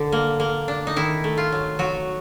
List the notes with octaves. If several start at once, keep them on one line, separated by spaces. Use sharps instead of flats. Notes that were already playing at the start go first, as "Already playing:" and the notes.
Already playing: D3
A#3
A#3
D4
D#4
D#3 E4
A3
F4
F#3
F#3 F#4